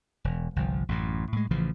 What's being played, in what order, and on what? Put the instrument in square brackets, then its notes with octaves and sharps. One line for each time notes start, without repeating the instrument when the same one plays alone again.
[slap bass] E1
G1 C2 F3
A1 F#2 A2
A2 G#3
A1 C#3 E3 F3